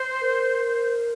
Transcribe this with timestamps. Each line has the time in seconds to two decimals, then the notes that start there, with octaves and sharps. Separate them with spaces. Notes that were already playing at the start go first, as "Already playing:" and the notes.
Already playing: C5
0.21 A#4